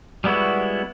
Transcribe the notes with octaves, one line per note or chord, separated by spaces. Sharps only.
G3 G#3 B3 E4 F#4